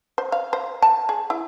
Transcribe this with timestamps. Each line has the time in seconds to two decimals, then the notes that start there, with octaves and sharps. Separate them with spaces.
0.18 C5
0.32 F5
0.53 C5
0.82 A5
1.09 G#4
1.30 E4